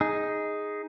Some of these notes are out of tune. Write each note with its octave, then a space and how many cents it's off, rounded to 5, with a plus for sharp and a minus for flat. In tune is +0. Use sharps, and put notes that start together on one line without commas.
D#4 +5 G#4 +0